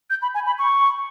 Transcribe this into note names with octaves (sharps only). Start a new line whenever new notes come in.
G6
B5
G#5
B5
C#6